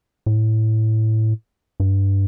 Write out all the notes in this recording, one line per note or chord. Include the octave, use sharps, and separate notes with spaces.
A2
G2